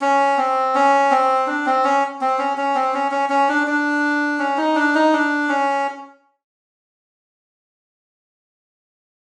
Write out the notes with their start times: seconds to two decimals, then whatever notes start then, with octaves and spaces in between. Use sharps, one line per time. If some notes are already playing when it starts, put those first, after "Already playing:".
0.01 C#4
0.37 C4
0.75 C#4
1.11 C4
1.47 D4
1.66 C4
1.84 C#4
2.21 C4
2.38 C#4
2.57 C#4
2.75 C4
2.94 C#4
3.11 C#4
3.29 C#4
3.49 D4
3.67 D4
4.39 C#4
4.57 D#4
4.75 D4
4.95 D#4
5.13 D4
5.49 C#4